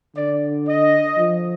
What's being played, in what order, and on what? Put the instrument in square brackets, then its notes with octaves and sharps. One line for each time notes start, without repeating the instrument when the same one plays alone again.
[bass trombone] D3 [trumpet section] D5
[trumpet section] D#5
[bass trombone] F3